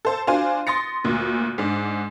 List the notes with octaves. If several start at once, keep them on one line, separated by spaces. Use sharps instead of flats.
A4 C5 A5
D4 F4 F#4 C5 F5 G#5
C6 D#6 A6 A#6 C#7
D2 A#2
G#2 D4